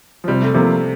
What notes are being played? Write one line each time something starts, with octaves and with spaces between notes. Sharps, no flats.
F3
C3 G3
A3
C3 F3 A#3 F4